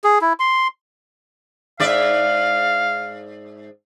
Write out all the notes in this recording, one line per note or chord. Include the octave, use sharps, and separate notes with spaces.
G#4
E4
C6
G#2 D5 E5 F5